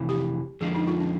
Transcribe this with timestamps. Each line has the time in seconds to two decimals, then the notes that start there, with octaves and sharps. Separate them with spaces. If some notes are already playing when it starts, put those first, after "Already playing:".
Already playing: F2 C3 E3
0.09 G4
0.61 F2 D3 F3 G#3 G#4
0.75 D#4
0.87 F4
1.00 C#4